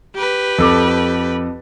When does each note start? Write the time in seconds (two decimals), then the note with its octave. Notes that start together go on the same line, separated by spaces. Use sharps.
0.15 G4 B4
0.58 F2 A4 D6